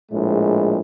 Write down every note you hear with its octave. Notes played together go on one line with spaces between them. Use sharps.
A#1 A2 G#3